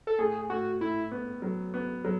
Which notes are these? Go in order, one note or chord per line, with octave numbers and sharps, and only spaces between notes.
A4
A2 G#4
A2 F#4
A2 E4
B3
F#3
B3
F#3